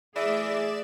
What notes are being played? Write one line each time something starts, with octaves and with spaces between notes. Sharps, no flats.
E3 A3 G#4 D5 E5 E7